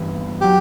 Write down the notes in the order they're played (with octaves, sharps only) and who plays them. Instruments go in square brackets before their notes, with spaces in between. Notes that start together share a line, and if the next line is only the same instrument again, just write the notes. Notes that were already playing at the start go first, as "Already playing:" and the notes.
Already playing: [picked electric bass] G1 G2 E3
[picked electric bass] F#3 [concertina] G4